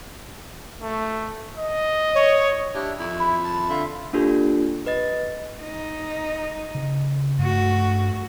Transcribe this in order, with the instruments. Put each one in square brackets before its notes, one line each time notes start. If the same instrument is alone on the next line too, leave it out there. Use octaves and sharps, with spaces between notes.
[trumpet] A3
D#5
[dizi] C#5
[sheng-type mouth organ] D4 E4 [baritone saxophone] G4
[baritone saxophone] F2 [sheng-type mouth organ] E4
[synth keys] B5
[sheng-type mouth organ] A5
[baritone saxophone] D3 [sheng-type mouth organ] F4 E5
[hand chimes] A#3 D4 F4 G4 A4
B4 D#5 A6
[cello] D#4
[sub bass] C#3
[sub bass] G2 [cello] A3 F#4